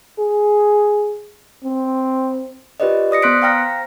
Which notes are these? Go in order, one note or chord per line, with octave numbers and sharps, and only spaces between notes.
G#4
C4
F4 G4 B4 C5 D5 D#5
D5 D#6 A#6 C#7
B3 C5 C6 F#6 B6 D7
C5 F5 G5 A#5 F6 A#6